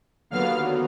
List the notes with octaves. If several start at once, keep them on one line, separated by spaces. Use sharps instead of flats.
D#2 D3 F#3 B3 F5 F6